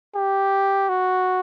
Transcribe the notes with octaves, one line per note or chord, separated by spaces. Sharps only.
G4
F#4